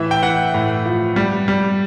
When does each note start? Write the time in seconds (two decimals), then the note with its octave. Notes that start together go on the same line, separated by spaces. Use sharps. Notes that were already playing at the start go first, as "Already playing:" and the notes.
Already playing: A2 E3 E5
0.11 G5
0.23 E3 F#5
0.54 A2
0.85 F3
1.16 G3
1.48 G3